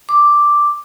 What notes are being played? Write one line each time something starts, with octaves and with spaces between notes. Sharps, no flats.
D6